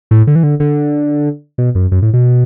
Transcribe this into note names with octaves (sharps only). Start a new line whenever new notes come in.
A2
D3
E3
D3
D3
B2
F#2
F#2
A2
B2